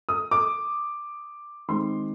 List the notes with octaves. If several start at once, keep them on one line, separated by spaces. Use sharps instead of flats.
D#6
D6
D#3 G#3 C4 C6